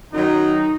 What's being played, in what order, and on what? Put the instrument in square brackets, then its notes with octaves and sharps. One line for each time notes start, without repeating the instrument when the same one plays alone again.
[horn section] F#2 D#3 F#3 D#4